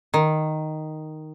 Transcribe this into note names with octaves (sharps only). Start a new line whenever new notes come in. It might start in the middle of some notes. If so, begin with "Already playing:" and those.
D#3